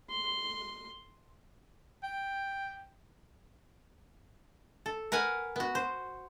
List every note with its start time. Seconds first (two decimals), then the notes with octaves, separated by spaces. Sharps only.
0.10 C6
2.03 G5
4.86 A4
5.12 A#4 B4 F#5 G#5
5.56 B3 F#4
5.75 C5